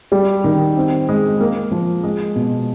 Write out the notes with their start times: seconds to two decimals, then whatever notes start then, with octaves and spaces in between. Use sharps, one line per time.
0.12 G3
0.44 D#3
0.76 C4
1.09 G#3
1.41 A#3
1.71 F3
2.04 G#3
2.35 B2